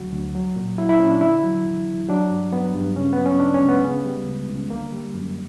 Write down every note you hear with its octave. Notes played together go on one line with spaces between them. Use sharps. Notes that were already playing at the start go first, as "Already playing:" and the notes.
Already playing: D2 D3 F#3 F#4
D2
F#3
A#2
F#3 E4
E4
A#2 C#4
D4
D3 E4
F#3
E2
E2
F#3 D4
G2
F#3 B3
G2
C#3 C#4
F#3 B3
C#4
C#2 D4
C#4
C#2
B3
C#3
G3
C#2
C#2
D3 A#3
G3
F#2